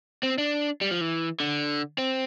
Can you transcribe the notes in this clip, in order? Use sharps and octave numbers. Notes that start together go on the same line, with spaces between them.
C4
D4
G3
F3
E3
D3
C4